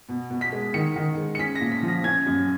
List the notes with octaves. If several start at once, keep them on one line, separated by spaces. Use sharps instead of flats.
B2
B2
B6
G#3
D#3 C#7
D#3
G#3
C#7
C#4 B6
A#6
A#2
B6
F3
A#6
C#4 G#6
F#2